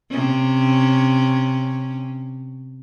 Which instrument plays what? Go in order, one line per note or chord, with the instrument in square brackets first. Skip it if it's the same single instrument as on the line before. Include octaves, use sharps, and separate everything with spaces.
[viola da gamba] C3 C#4